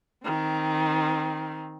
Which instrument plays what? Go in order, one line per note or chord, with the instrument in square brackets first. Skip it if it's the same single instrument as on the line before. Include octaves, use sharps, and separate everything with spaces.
[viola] D#3 C4